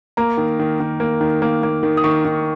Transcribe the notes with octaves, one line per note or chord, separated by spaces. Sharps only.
A#3 A#5
D#3
D#3
D#3
A#3
D#3
A#3
A#3
D#3
D#6
D#3 C#6
D#3